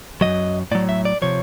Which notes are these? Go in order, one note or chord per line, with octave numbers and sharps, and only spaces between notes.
F#2 D#3 F#3 D#5
A2 F#3 D5
E5
D5
C3 F3 C#5